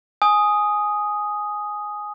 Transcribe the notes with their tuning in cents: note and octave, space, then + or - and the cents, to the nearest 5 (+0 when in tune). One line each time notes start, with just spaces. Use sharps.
G#5 +5 D#6 +0